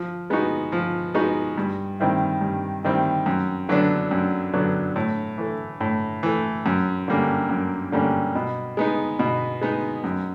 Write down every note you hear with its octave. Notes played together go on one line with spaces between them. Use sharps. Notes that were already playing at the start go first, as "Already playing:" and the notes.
Already playing: F3
G#3 B3 D#4 F#4
F3
G#3 B3 D#4 F#4
G2
D#3 G3 C4 E4
G2
D#3 G3 C4 E4
F#2
D3 F#3 B3 D4
F#2
D3 F#3 B3 D4
A2
E3 A3
A2
E3 A3
F#2
D3 G3 A#3 C#4
F#2
D3 G3 A#3 C#4
B2
G#3 B3 D#4
B2
G#3 B3 D#4
F#2